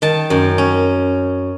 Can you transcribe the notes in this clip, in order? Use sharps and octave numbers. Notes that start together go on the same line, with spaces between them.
D#3 A5
F#2
C#4